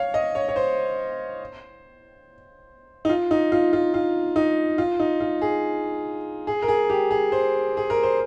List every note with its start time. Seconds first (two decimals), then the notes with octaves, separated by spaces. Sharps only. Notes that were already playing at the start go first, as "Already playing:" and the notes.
Already playing: C#5 F5
0.14 D#5
0.35 C#5
0.49 C#5
0.56 C5
3.05 D#4
3.09 F4
3.31 D#4
3.52 F4
3.73 F4
3.94 F4
4.36 D#4
4.78 F4
5.00 D#4
5.20 F4
5.42 G#4
6.47 G#4
6.62 A#4
6.68 G#4
6.90 G4
7.11 G#4
7.32 C5
7.77 G#4
7.90 A#4
8.03 C5